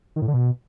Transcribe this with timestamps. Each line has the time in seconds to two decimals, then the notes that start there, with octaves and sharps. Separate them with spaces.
0.16 D#3
0.22 A2
0.28 D3
0.34 B2